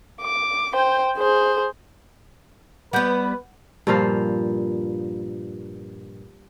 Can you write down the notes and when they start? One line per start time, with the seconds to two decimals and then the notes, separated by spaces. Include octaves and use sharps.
0.22 D6
0.74 C5 G5
1.17 G#4 C5
2.93 G3 B3 B4 F#5 G6
3.87 G2 A#2 F3 F5